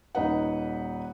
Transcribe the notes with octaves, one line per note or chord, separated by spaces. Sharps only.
D#1 D#4 B4 F#5